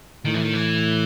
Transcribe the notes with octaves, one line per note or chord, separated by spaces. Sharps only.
A2 D#3
E3
D#3
E3